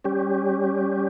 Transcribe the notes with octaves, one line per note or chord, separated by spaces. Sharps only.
G3 C#4 G4